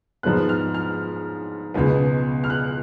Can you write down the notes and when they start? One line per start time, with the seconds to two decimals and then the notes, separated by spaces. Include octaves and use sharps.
0.23 G#2 F3 G#3 B3 F#6
0.49 F6
0.74 F6
1.74 C#2 B2 G#3 B3
2.44 F6
2.50 F#6